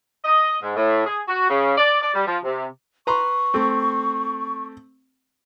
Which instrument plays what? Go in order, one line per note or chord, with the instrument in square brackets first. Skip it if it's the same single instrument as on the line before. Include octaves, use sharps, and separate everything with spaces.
[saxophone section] D#5
G#2
A2
G#4
F#4
C#3
D5
D5
G3
F3
C3
[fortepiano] B4 A#5 C6 [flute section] C#6
[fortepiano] A3 C4